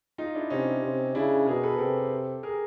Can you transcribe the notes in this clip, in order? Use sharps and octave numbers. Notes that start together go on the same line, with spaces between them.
D#4 F4
D4 E4
C3 C#4 D#4
C3
C#3 D4 E4
B2 G#4 A#4
A4 B4
C3 G4 A4
G#4 A#4